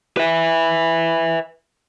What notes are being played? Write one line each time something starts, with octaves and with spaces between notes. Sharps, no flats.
B4 E5